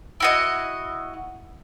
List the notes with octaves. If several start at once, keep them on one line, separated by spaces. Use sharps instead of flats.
E4 F#4 D#5